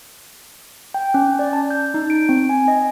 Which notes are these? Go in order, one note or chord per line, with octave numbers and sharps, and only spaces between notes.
G5
C#4
D5
A5
G6
D#4
D7
C4
G#5
D#5